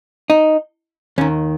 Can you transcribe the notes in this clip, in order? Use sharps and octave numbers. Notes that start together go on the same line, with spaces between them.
D#4
D#2 D#3 C#4